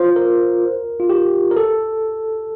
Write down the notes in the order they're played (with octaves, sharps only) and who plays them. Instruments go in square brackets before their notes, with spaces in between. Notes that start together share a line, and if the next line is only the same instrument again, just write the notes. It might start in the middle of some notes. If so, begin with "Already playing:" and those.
Already playing: [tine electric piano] F4 C5
A#4
F4
G4
A#4
A4